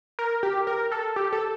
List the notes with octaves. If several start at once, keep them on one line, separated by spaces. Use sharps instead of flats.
A#4
G4
A#4
A4
G4
A4